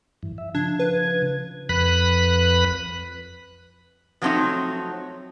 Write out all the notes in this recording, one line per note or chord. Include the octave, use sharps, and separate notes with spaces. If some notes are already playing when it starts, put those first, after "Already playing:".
G2 E3
E5
C#3 F3 D4 G#6
B4
F2 B4 B5 F#6
F3 F#3 A3 A#3 C4 D#4